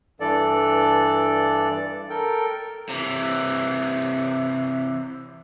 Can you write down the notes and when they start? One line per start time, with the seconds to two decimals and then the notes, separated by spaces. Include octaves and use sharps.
0.20 G2 E3 A4 D5
2.10 A4 A#4 G5
2.89 C3 E3